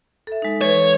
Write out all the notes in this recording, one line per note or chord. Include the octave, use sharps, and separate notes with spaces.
A4 E5
G#3 D#4
E3 B4 C#5 A6